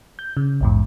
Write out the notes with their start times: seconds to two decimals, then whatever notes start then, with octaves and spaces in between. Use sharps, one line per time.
0.19 G6
0.37 C#3
0.61 A#1 E2 G#2